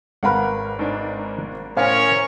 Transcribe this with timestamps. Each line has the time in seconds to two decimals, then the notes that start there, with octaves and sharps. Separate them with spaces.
0.23 G#1 A#4 B4 F5 F#5 B5
0.79 G#2 D4
1.77 A2 C#4 A#4 C5 C#5 F5 G#5 F6